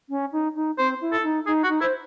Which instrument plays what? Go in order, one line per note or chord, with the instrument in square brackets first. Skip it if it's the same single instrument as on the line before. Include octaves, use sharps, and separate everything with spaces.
[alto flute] C#4
D#4
D#4
[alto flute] C4 [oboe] C5
[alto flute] E4
[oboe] A4
[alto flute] D#4
[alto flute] D#4 [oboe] G#4
[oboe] F#4
[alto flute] D#4
[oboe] E4 [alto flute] C5